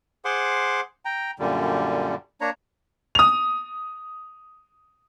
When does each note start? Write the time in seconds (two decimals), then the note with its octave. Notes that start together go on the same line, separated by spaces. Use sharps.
0.25 G#4 C5 F#5 C6 D6
1.05 G5 A#5
1.39 F#2 A#2 D3 G3
2.41 A#3 D4 C#5 A#5
3.15 D#6 F7